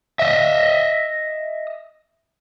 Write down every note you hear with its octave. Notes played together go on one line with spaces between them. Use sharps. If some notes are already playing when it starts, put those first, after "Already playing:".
D#5 E5